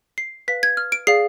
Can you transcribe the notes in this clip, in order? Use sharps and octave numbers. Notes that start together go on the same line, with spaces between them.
C7
B4 F5 B6
G#6
F6
D7
G#4 D5 F5 C7